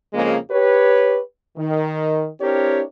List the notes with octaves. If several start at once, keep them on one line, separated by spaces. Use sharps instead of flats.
F2 C#3 F3 G#3 A#3
G4 B4 C#5
D#3
C4 D4 E4 G4 A#4 C#5